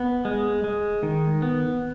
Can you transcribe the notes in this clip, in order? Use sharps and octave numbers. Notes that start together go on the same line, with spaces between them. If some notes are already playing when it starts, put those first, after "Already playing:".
Already playing: B3
G#3
G#3
D#3
B3